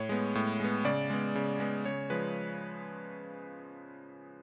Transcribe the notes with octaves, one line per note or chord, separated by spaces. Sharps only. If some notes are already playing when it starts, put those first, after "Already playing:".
Already playing: A2 C#5
G#3 B3
A2
G#3 B3
C#3 D5
G#3 B3
C#3
G#3 B3
C#3 C#5
F3 G#3 B4